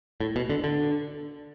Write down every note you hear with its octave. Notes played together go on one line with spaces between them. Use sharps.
A2
B2
D3
D3